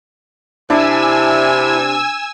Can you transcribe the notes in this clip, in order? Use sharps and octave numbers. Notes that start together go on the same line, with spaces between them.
C3 D4 E4 G#5 E6